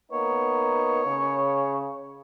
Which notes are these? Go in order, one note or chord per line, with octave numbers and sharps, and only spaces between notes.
A#3 B3 D#4 C#5
C#3